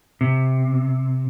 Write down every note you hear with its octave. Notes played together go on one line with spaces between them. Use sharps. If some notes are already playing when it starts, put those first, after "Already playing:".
C3